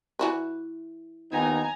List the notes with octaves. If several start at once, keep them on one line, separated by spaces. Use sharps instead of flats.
E3 F#4 B4
D#2 B3 D#4 G#5 A#5